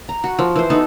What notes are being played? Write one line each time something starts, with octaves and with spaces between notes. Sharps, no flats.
A#5
F#4
F3
E3 C5
B3 D#4 F#4 A4